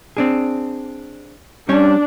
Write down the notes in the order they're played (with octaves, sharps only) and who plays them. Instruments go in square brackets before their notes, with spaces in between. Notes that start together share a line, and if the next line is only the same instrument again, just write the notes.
[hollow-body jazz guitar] C4 D4 G#4
[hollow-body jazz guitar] G3 C#4 C#5 [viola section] D4